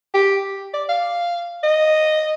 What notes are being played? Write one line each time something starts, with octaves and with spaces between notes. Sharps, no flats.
G4
D5
F5
D#5